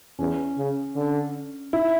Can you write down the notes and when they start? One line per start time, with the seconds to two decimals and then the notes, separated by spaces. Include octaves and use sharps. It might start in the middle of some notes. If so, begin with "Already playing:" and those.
0.19 E2 C#4
0.58 C#3
0.96 D3
1.73 E4